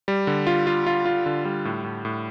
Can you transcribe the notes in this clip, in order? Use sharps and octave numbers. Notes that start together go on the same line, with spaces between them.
G3
D3
F4
F4
F4
F4
D3
G3
A2
A2
A2